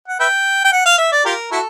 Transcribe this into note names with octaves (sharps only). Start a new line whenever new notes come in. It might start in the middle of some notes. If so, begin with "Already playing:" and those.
F#5
B4 E5 G5
G5
F#5
F5
E5
D5
F4 G4 A#4
E4 F#4 A4